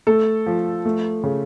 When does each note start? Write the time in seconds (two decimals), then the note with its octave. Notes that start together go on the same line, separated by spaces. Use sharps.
0.07 A3 A4
0.46 F3
0.86 A3
1.23 C#3